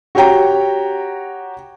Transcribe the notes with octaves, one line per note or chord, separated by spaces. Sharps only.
F#4 G4 C#5 G5 A#5